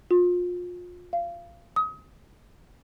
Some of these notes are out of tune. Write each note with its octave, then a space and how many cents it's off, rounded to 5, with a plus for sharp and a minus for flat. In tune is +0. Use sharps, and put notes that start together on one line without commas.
F4 +30
F5 -25
D#6 +30